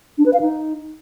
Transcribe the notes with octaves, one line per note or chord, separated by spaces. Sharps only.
D4
B4
F5
D#4